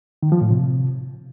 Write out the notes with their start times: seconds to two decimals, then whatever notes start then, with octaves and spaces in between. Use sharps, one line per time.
0.23 D#3
0.32 F3
0.41 A2
0.51 C3